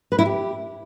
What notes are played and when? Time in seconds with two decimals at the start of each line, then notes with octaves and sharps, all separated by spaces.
0.12 B4
0.19 E4
0.25 G4